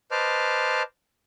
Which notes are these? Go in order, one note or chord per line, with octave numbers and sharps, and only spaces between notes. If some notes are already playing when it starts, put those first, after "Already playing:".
B4 C5 D#5 A5 D6 F6